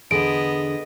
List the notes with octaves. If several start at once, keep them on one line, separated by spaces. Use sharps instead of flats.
E2 D3 B3 G#4 D#5 D7